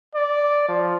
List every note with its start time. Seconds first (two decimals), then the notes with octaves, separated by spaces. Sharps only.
0.15 D5
0.69 F3